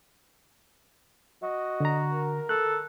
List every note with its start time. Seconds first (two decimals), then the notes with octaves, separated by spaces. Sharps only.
1.43 F#4 D#5
1.80 D3 A#5
2.12 A#4
2.49 A4 F#6